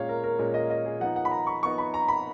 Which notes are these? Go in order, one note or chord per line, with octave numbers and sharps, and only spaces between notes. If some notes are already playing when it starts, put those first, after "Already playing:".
Already playing: A#2 G#3 C#4 C#5 F5
A#4
A#4
A#2 G#3 C#4 A#4
D#5
D#5
G#4
F3 B3 D#4 F#5
F#5
B5
A#5
C#6
F3 B3 D#4 C#6
B5
A#5
B5